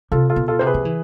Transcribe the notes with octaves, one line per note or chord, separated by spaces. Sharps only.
C3 F4 A4
F4 A4
B2
F4 A4
C3 C5
G#4 B4
F3
E3